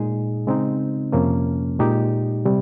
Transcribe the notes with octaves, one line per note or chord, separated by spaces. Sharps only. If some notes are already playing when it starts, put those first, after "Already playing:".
Already playing: A#2 G#3 D#4 G#4
C#3 G#3 C4 D#4
F2 C3 F3 A#3 C#4
A#2 G#3 D#4 G4
C3 G3